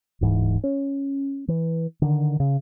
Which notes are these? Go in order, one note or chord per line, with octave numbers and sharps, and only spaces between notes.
D1 G#2 E3
C#4
E3
D3 D#3
C#3